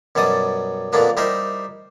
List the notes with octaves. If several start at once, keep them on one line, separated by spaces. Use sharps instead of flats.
F#2 B2 G3 A5 D6 D#6
F2 A#2 D3 A#3 B3 D4
G3 D#4 E4 G4 A#4 C5